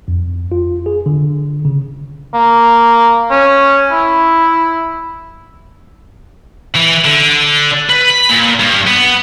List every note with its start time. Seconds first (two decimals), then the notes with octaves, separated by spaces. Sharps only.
0.08 F2
0.52 F4
0.86 G#4
1.06 D3
1.65 C#3
2.34 A#3
3.31 C#4
3.92 E4
6.75 E3
7.05 D3
7.89 B4
8.10 B5
8.29 A#2
8.59 G2
8.87 B3